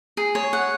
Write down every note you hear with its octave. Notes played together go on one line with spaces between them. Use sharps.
G#4
C#5
F#5